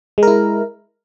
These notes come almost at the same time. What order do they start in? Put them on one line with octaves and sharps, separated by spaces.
G#3 A#4 E4